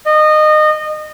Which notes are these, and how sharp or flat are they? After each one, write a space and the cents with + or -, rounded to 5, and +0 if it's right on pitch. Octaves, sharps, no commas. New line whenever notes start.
D#5 -25